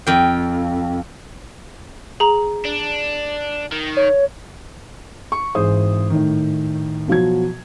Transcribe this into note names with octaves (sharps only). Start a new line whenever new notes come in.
F2 G5
G#4 A#5
D4
D#3
C#5
C#6
G#1 E3 G#4 C5 D#6
A2 D#3
B2 F3 F#3 G#6